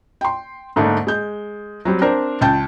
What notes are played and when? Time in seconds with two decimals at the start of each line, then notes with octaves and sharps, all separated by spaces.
0.21 G5 C6
0.76 G#2 D3 A3 A#3 D4 D#4
1.07 G#3 G6
1.85 F#3 G3 C4
2.01 C4 D4 A#4 C5
2.41 C#2 G5 A5 G6